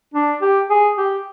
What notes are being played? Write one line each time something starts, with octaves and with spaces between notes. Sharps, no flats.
D4
G4
G#4
G4